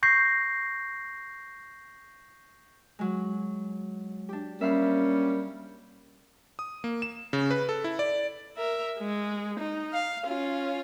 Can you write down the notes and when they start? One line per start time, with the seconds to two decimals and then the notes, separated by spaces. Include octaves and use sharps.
0.03 C#6 G6 A#6 C7
2.99 F#3 G#3
4.29 D4 G4
4.61 G3 A#3 C#4 E5 F5 B5
6.59 D#6
6.84 A#3
7.02 E7
7.33 C#3
7.51 B4
7.69 A4
7.84 E4
7.99 D5
8.57 A#4 E5
8.99 G#3
9.60 D#4
9.93 F5
10.26 C#4 F4